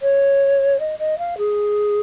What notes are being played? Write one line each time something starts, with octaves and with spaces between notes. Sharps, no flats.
C#5
D#5
D#5
F5
G#4